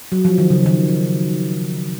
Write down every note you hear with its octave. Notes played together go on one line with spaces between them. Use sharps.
F#3
F3
D#3
C#3
D#3